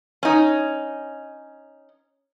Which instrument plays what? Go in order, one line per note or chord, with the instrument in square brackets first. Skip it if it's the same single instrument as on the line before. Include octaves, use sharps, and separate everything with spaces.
[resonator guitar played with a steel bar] C#4 D#4